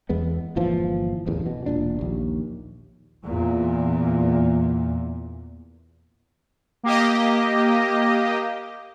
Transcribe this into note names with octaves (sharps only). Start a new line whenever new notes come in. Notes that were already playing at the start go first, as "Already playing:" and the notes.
E2 G#3 B3
G1 A#2 E3 F3
D1 A1 E2
B2
E1 A#2 D4
A#1 D#2
E2 A#2
A#3 G4 D#5